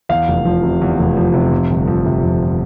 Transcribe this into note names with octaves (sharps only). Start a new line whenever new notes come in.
E2 F5
F1
F3
C3
E2
F1
F3
C3
F2
G1
F3
C3
F2